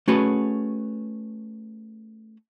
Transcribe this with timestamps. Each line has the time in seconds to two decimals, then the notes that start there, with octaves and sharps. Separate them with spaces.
0.08 A3 C#4 F#4 G#4 B4